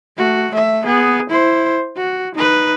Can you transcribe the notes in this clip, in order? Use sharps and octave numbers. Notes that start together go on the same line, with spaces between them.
A3 F#4
A3 E5
B3 G#4
E4 C5
F#4
D#4 B4